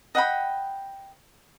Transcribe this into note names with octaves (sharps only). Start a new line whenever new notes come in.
D#5 F#5 G5 B5